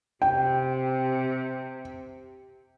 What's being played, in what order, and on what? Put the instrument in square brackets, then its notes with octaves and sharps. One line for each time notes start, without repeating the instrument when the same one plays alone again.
[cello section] C3 [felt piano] G5